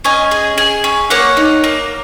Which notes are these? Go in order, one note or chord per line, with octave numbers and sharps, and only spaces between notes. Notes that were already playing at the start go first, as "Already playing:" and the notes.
C#4 D#5 G#5
G#4
G#4
C#4
A#3 C#5 F#5
D#4
A#3